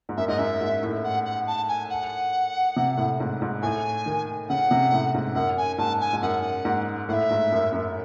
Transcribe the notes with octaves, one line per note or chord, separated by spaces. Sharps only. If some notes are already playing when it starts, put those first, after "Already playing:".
G#2
F#2 E5
G#2 D#5
F#2 E5
G#2
A2
F#5
F#5
A5
G#5
F#5
C3
A2
G#2
G#2
A2 G#5
D#3
C#3 F#5
C3
A2
G#2
F#2 F#5
G#5
G#2 A5
G#5
G#2
F#2 F#5
G#2
A2 E5 F#5
G#2
F#2
F#2